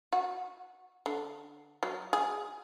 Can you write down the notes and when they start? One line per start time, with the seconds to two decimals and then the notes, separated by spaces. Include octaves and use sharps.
0.13 F#4
1.06 D3
1.83 F#3
2.13 G#4